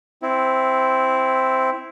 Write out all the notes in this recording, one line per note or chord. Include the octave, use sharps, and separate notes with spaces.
C4 E4